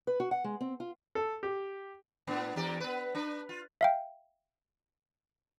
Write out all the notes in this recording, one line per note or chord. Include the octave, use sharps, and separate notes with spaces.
B4
F#4
F#5
G#3
C4
F4
A4
G4
A2 B3 D4
E2 G4 D5
B3 B4
D4 B4
F4
E5 F5 G5